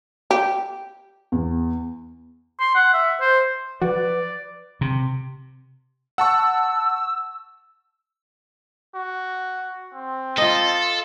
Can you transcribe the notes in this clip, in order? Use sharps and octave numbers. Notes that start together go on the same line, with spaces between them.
G4
E2
C6
F#5
E5
C5
F3 F#4 B4 D5
C3
F#5 A5 C#6 E6
F#4
C4
F4 A4 D#5